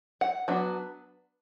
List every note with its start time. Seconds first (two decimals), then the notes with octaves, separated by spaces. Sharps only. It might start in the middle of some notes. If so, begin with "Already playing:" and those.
0.21 F#5
0.48 F#3 B3 D4